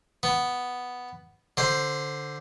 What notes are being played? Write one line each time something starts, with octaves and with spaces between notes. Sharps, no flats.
B3
D3 C5